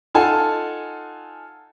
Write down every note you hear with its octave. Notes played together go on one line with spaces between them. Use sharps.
D#4 F4 A4 F#5 G#5 A5